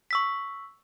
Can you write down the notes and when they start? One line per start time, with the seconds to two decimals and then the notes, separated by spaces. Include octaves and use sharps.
0.11 C#6 E6 B6